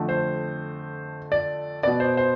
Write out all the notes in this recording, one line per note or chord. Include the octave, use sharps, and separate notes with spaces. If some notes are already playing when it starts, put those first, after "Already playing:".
Already playing: F2 D3 A3
C5
D5
B2 B3 D5
C5
C5